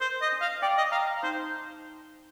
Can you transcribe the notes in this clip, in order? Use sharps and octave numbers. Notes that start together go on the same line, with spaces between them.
A#4 C5
D#5
D4
F5
D5 G5
D#5
F5 A#5
D#4 C5